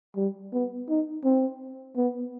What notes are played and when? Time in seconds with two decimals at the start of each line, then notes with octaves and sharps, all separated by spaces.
0.16 G3
0.53 B3
0.89 D#4
1.24 C4
1.97 B3